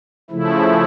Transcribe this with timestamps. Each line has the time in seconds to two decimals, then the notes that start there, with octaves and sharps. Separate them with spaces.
0.30 C#3 F3 A3 E4